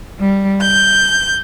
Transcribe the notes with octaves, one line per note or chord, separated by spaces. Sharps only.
G3
G6